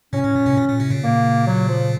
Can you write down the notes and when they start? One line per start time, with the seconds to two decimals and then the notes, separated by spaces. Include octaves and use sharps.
0.13 A2 C3 C#4
0.24 A2
0.36 A#2
0.46 A2 C3
0.58 A#2
0.69 A#2
0.80 A2 C3
0.90 A#2 C#3
1.02 A#3
1.47 F#3
1.69 F3